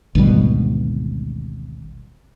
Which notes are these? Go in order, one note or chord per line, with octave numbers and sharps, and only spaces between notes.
G#1 D2 B2 G3